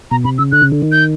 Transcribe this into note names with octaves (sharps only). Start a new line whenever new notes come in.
B2 A#5
C3 B5
C#3 E6
D3 F#6
C#3
D3
D#3
G6